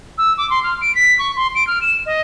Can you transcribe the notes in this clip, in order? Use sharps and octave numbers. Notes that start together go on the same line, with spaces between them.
E6
D6
C6
F6
D7
B6
C#6
C6
D7
F6
E7
D#5